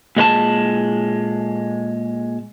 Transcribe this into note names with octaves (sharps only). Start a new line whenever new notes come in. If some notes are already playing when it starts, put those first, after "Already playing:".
A#2 G#3 B4 A5